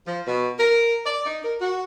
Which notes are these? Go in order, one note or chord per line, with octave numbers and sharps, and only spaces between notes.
F3
B2
A#4
D5
D#4
A#4
F#4